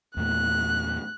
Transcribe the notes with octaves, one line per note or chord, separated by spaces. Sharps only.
E2 A#2 A3 F#6